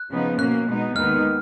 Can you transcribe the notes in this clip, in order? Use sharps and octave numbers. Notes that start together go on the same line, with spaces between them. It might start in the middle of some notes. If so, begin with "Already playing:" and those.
Already playing: F#6
C#3 F3 B3 D#4
B2 A#3 C#4 F#6
B2 G#3 B3 D#4
D#2 D#3 G#3 B3 D#4 F6